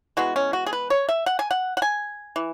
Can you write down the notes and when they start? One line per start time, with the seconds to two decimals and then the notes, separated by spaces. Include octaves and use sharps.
0.17 E3 G#3 B3 F#4
0.36 C#4
0.53 F#4
0.66 G#4
0.73 B4
0.90 C#5
1.09 E5
1.26 F#5
1.39 G#5
1.51 F#5
1.77 F#5
1.82 G#5
2.36 E3